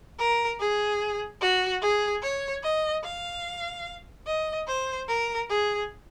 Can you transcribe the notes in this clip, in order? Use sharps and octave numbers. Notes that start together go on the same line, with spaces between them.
A#4
G#4
F#4
G#4
C#5
D#5
F5
D#5
C5
A#4
G#4